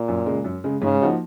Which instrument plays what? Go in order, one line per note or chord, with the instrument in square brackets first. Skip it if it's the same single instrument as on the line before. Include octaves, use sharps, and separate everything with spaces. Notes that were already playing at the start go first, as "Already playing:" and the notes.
Already playing: [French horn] A#2
[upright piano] F#2
C#3 G#3
F#2
C#3 G#3
[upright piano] G#2 [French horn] C#3
[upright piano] F3 A#3 D#4 F#4